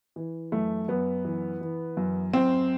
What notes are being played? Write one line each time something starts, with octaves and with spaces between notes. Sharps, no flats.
E3
F#2 A3
F#2 B3
E3
E3
F#2
F#2 C4